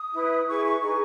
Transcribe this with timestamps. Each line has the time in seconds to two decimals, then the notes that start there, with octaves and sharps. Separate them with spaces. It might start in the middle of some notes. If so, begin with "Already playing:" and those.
Already playing: D#6
0.12 E4 B4
0.47 E4 G#4 B4 C#6
0.64 C#6
0.81 D#4 G#4 B4 C#6